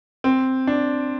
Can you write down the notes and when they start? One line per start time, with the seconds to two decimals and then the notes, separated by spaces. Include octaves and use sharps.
0.24 C4
0.67 D4